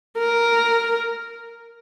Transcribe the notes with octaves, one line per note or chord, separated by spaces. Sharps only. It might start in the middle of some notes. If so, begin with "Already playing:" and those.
A#4